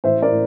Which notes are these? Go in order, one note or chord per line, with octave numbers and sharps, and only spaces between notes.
A1 C5 E5
A#4 D5
A2